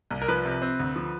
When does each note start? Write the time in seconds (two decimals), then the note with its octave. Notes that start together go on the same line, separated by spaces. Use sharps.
0.11 C2
0.22 A#4
0.28 F3 B4
0.45 C3
0.62 C4
0.80 D2
0.96 F3